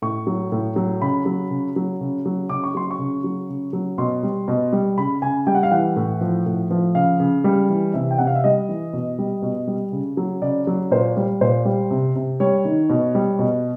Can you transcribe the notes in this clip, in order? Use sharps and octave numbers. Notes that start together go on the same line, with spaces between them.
A2 C#6
F#3
A2
F#3
C#3 B5
F#3
C#3
F#3
C#3
F#3
C#3 D6
C#6
F#3 C6
C#6
C#3
F#3
C#3
F#3
B2 C6
G3
B2
G3
C#3 B5
C#3 G#5
G3 G5
F#5
F5
E3 F#5
A2
F3
A2
F3
C#3 F5
C#3
G3
E3
C3 E5
G5
C3 F#5
F5
E5
G3 D#5
E3
B2
G3
B2
G3
C#3
F#3
C#3 D5
F#3
A#2 C5
G3
A#2 C5
G3
C3
C3
G3 C#5
D#3
B2
G3
B2